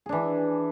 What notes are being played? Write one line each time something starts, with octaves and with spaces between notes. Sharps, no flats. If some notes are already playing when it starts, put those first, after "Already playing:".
E3 D4 G#4